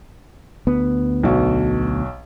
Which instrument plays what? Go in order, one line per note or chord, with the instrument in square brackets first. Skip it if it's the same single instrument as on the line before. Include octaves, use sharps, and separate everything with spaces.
[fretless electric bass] D2 B3
[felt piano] B1 F#4